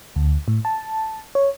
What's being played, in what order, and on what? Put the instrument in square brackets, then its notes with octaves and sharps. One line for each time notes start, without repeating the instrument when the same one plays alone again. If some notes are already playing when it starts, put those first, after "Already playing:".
[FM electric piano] D2
A2
A5
C#5